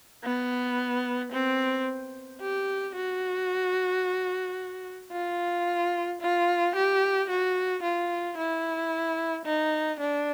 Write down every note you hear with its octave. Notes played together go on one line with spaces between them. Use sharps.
B3
C4
G4
F#4
F4
F4
G4
F#4
F4
E4
D#4
D4